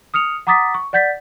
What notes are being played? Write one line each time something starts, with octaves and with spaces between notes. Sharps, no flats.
D#6 F6 C#7 F7
F#5 A#5 D6 D#6 A6 B6
C#6
D5 F#5 G6 A6 B6